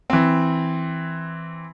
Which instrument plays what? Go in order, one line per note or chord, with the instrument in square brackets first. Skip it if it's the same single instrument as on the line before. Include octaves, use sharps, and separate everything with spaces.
[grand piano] E3 C4